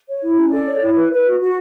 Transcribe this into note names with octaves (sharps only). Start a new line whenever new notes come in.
C#5
E4
C#4
A4 D5
C#5
E4
B4
B4
F#4
F#4